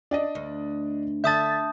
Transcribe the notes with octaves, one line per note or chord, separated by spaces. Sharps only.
D4 D5 D#5
D2
D3 E5 A5 D#6 G6 A6